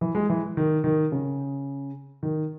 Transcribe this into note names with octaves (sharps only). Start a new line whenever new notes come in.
E3
G#3
E3
D#3
D#3
C#3
D#3